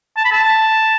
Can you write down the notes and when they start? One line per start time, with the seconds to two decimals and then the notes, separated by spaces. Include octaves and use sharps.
0.17 A5
0.25 B5
0.32 A5